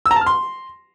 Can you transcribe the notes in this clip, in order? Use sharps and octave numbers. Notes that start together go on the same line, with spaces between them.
E6
A#5
A5
F6
C6